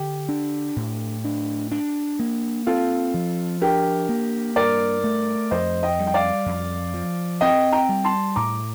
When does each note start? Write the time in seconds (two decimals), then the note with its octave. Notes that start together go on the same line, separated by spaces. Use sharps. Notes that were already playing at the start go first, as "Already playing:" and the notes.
Already playing: D3 G4
0.29 D4
0.76 A2
1.24 D4
1.72 D4
2.19 A#3
2.67 C4 F4 A4
3.14 F3
3.61 D4 G4 A#4
4.09 A#3
4.56 G2 A#4 D5
5.04 A3
5.51 F2 C5 D#5
5.83 D#5 G5
5.99 G3
6.07 G5
6.14 D5 F5
6.46 F2
6.94 F3
7.41 C4 D#5 G5
7.72 G5 A#5
7.89 G3
8.04 A5 C6
8.36 A2 A#5 D6